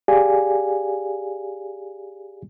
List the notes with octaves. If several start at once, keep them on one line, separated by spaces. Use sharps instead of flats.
G4 G#4 D5 F5 G#5